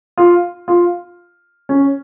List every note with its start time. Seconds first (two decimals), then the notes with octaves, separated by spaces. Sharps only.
0.17 F4
0.68 F4
1.69 C#4